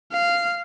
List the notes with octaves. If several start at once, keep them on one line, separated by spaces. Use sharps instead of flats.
F5